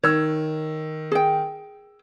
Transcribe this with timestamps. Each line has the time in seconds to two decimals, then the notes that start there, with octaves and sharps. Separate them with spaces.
0.03 D#3 C#5 E6
1.12 G#4 G5